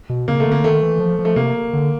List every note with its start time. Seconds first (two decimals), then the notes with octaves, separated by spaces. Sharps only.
0.10 B2
0.28 C#3 A#3
0.40 A3
0.46 D3
0.52 A#3
0.64 D#3 A3
0.83 E3
1.00 F3
1.19 F3
1.25 A3
1.36 C3 A#3
1.73 D3